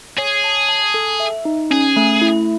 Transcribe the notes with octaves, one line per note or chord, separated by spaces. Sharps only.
G#4 C#5
A5
A5
A4
E5
D#4
C#4 G#4
A3
E4